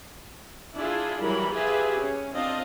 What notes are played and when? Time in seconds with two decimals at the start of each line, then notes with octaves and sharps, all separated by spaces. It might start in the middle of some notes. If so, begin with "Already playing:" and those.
0.75 D4 E4 F4 G#4
1.22 E3 F#3 G3 A#4 B5
1.52 F4 G4 G#4 B4 E5
1.99 C#4
2.33 C4 D4 F4 D#5 F5